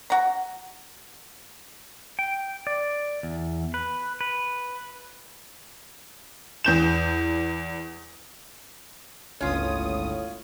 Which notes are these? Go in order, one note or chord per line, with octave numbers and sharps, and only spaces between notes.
F#4 A#5
G5
D5
E2
B4
B4
E2 G6 E7
G1 C#2 A2 C#4 F4 D#6